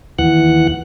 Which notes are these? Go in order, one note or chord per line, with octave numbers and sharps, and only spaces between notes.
D#2 E3 F#5 F#6